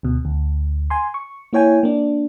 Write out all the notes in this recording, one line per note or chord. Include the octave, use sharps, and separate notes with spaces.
D2 B2
D2
G#5 C6
C#6
A#3 E4 C#5 G5 G#5
A#3 D4